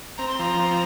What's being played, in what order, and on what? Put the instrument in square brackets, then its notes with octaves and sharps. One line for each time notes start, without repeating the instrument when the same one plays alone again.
[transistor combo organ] C4 [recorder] A#5
[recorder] C6
[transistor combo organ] F3 [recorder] A#5
[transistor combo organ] C4